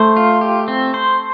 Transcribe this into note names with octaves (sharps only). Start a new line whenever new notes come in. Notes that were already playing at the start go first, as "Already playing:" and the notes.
Already playing: A3 C5
F4
G4
C4
C5